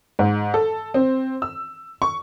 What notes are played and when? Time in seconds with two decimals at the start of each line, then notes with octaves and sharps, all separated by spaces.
0.19 G#2
0.54 A4
0.94 C4
1.42 E6
2.02 C#6